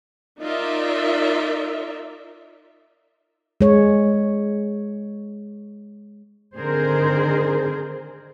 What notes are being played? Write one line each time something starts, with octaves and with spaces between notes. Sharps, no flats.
D#4 F4 A#4 D5 E5
G#3 C#5
D3 D#3 C4 G#4 A#4 C5